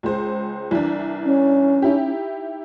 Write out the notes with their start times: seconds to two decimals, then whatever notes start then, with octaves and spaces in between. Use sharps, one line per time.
0.03 C#2 G#3 C5
0.71 C2 E3 D4
1.25 C#4
1.82 D#4 E4 G4